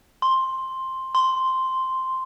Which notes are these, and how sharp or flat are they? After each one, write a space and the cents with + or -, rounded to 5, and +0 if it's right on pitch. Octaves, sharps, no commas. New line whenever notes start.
C6 +5
C6 -5